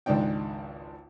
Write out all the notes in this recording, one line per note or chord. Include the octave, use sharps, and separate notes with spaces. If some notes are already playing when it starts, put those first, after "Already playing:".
G#1 C#2 G#2 D4 D#4 G5